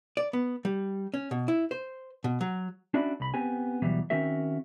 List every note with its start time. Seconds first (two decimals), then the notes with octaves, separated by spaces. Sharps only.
0.17 D5
0.33 B3
0.65 G3
1.14 C#4
1.31 B2
1.48 E4
1.71 C5
2.24 B2
2.41 F#3
2.94 C#4 D4 F#4 D5 E5 B5
3.20 C2 B5
3.34 B3 C4 G4 G#5
3.82 D2 B2 E3 F#3 G3
4.10 D#3 C4 C#4 F#4 A#4 E5